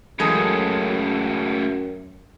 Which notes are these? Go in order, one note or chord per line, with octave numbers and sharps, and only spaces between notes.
F#2 A2 C#3 E3 G#3 A4